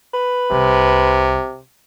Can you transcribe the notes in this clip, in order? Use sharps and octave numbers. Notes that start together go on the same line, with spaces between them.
B4
C2 C3